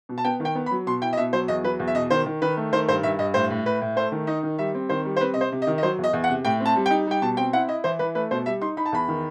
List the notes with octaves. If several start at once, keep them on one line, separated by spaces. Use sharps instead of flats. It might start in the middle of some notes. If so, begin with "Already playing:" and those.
B2
A5
B3 G5
D#3
G5
B3
B5
F#3
B2 C6
E4 G5
D#5
B2 E5
F#3 C5
E2 D#5
F#3 B4
E2
E5
B2 D#5
D#3 C5
D#3
D#3 B4
A3
D#3 C5
G2 C5
G2 E5
G2 D#5
A2 C5
A2
A2 B4
A2
A3 C5
D#3
D#4 D#5
D#3
G3 E5
C4
D#3 C5
G3
C5
C4 B4
C3 D#5
C5
C3
D#5
D#3
D#5
F#3 C5
E2
D#5
E2
F#5
C3
A2 G5
C4
A5
G3
G5
D#4
G3 G5
B2 A5
C4 G5
E4 F#5
E4 D#5
E3 C5
E3 B4
A3 B4
B2 C5
G3 E5
D#4 C6
D#4 B5
A5
E2 B5
D#3